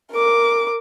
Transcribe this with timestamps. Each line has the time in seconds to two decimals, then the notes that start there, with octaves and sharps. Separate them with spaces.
0.12 A#4 D6